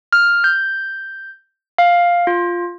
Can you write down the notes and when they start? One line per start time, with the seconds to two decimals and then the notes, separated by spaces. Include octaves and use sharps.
0.13 F6
0.44 G6
1.78 F5
2.27 F4